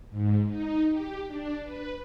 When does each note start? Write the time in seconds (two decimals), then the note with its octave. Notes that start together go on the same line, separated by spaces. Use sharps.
0.10 G#2
0.47 D#4
0.88 G4
1.26 D4
1.63 B4